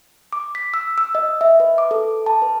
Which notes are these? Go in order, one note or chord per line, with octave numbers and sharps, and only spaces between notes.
D6
B6
E6
E6
D#5
E5
B4
D6
A4
A5
B4